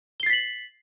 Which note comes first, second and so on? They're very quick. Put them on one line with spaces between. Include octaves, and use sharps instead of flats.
G7 C7 A6 B6 F#7